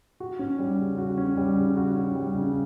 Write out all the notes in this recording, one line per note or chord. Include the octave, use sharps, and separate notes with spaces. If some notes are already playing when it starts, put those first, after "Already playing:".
F#4
C#4
G3
C#3
F#4
C#4
G3
C#3
F#4
C#4
G3
C#3